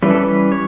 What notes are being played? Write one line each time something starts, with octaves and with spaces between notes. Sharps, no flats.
E3 G3 C#4 B4
A4
B4
C#5